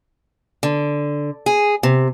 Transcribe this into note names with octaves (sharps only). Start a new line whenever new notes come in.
D3
G#4
C3